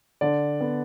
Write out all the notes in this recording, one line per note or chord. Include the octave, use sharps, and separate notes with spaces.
D3 D5
B3